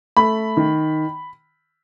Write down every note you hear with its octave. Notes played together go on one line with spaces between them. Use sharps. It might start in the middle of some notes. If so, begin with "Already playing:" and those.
A3 B5
D#3